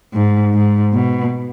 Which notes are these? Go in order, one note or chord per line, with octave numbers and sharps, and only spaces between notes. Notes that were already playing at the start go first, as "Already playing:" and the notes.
G#2
G#2
B2